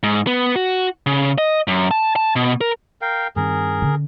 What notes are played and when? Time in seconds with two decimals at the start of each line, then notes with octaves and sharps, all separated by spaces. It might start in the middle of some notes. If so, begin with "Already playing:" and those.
0.03 G#2
0.27 B3
0.56 F#4
1.06 C#3
1.38 D#5
1.68 F#2
1.91 A5
2.16 A5
2.36 B2
2.61 A#4
3.02 A#4 F5 G5
3.36 G2 D#3 C4 G#4 A#4
3.81 D3 C#4